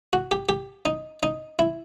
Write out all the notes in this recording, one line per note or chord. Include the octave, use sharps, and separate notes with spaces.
F#4
G4
G4
D#4
D#4
E4